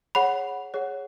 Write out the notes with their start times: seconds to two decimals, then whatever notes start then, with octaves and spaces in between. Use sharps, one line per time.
0.15 G#4 C#5 F#5 B5
0.74 G#4 C#5 F#5